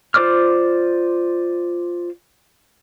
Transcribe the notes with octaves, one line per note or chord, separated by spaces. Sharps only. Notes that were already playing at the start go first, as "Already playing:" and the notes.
F4 C5 D5 D6 F6